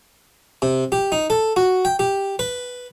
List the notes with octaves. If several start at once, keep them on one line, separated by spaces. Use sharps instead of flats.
C3
G4
D#4
A4
F#4
G5
G4
B4